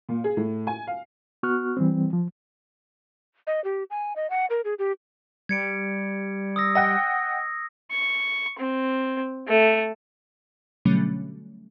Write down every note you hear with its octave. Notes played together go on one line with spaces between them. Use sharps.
A#2
G#4
A2
G#5
F5
B3 F#4 C#6 F6 F#6
E3 G3 C4
F3
D#5
G4
G#5
D#5
F#5
A#4
G#4
G4
G3 G#6 C#7 D7
D#6 E6 A#6
D#5 F#5 G5 A#6
C#6
C4
A3
B2 D3 F#3 G3 A3 C#4